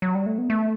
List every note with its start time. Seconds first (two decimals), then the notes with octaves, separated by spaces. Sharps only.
0.02 F#3
0.15 G3
0.26 A3
0.38 B3
0.50 A3